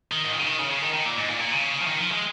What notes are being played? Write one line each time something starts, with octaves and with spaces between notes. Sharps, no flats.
D#3
G#2
A#2
C#3
D#3
C#3
C#3
D#3
D#3
A#2
G#2
A#2
A#2
C#3
F3
D#3
F3
G#3